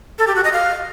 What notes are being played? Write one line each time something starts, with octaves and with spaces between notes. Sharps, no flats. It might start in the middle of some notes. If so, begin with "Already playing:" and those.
A4
G4
F#4
D#5
F5